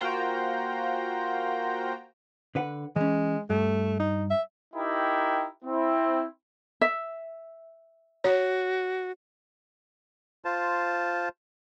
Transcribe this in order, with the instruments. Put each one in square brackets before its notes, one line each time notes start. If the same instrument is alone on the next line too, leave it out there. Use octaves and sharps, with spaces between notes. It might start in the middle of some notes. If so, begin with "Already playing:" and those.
[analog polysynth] A#3 F4 F#4 C5 G5 A#5
[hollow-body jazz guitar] D3 B4 F#5
[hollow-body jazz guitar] E3 C#4 [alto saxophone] G#3
[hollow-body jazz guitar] G2 [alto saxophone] A3
[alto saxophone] D#4
E5
[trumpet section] D#4 E4 G4 A#4 G5
C4 E4
[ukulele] E5
[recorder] F#4 [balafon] C#5
[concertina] F4 C5 A5